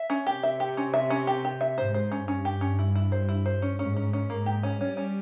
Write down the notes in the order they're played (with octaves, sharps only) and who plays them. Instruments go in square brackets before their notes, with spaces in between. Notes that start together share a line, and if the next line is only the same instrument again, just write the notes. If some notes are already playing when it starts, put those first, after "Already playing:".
Already playing: [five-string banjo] E5
C#4
[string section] C3 [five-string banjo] G4
[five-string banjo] E5
G4
C#4
E5
C#4
G4
G4
E5
[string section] G#2 [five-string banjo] C5
[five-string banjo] C5
C#4
[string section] G2 [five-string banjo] C#4
[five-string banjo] G4
C#4
E4
E4
C5
E4
C5
C#4
[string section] G#2 [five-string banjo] C#4
[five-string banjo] C#4
C#4
[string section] G#2 [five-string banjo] A#3
[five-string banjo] G4
C#4
[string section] G3 [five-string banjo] C#4
[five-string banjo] C#4